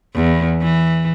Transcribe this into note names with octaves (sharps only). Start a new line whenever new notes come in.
E2
E3